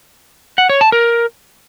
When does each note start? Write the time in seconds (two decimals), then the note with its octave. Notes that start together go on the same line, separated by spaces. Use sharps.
0.58 F#5
0.70 C#5
0.81 A5
0.92 A#4